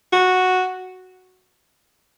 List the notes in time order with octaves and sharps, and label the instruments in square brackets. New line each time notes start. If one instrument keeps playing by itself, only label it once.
[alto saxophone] F#4